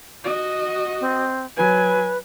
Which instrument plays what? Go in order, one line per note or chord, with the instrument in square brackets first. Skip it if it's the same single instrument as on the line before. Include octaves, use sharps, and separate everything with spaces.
[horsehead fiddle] F#4 D#5
[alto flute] C4
[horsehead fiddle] F#3 G#5 [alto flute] B4